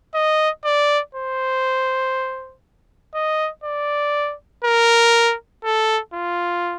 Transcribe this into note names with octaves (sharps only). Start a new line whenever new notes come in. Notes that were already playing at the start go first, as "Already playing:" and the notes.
D#5
D5
C5
D#5
D5
A#4
A4
F4